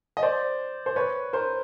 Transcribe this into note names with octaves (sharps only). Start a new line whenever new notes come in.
D#5
C5 D5
C5
B4 C#5
A#4 C5